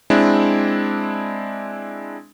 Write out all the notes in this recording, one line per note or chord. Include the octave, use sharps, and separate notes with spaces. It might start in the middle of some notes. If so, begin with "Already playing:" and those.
G#3 C4 D4 E4